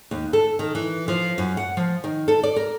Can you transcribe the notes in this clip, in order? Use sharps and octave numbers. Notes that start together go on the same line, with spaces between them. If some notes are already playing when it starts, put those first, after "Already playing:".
D#2
A4
D#3
E3
F3
F#2
F#5
F3
D#3
A4
D5
A#4